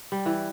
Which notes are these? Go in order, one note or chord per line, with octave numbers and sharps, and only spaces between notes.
G3
E3